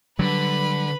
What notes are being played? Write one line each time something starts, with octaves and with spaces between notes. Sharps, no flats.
D3 F#3 G3 B4 B5